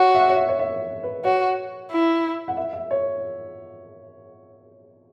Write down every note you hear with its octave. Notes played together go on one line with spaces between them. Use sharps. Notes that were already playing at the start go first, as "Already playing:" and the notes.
Already playing: F#4 C#5
E5
C#5
E5
C#5
E5
B4
F#4 C#5
E4
F#5
E5
E5
C#5